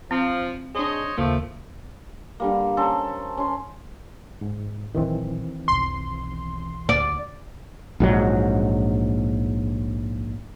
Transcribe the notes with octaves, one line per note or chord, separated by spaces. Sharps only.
F3 C4
D4 G#4 C5 C#5 D#5
D#2 C#3 F3 A3 A#3
D3 G3 A#3
C#4 A4 A#4 C5
C#4 C6
G#2
A#1 D#3 E3 F#3 C4
B1 E2 C6
D2 D5
A#1 G#2 F#3